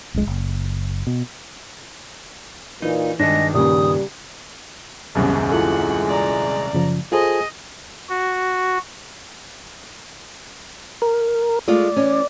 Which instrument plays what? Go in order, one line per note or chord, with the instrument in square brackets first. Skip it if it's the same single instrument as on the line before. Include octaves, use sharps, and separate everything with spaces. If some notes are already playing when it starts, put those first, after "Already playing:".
[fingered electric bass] D1 A#1 G#3
F#1
B2
[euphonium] A#2 [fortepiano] E3 [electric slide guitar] D#4
[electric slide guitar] G2 D#3 [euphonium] G#3 [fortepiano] D4 [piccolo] A#6
[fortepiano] C#2 A#2 C#3 [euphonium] G3 [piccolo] D#6
[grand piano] D#1 C2 F#2 [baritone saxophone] G#3 [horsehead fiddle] B3
[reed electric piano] E4 F4 A4 [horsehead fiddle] F#5
[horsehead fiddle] D5 A#5
[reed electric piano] F#2 C#3 F3
[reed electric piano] F4 A4 C5 [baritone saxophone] G#4 [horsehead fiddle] D#5
[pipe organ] F#4
[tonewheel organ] A#4
[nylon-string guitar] G#3 A3 F4 [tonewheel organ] D5
[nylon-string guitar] E3 C#4